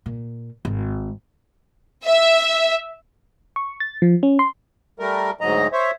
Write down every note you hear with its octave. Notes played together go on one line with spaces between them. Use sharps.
A#2
G#1
E5
C#6
A6
F3
C#4
C6
G3 A3 A#4
D2 G#2 F#3 D#5 A#5
C5 C#5 E5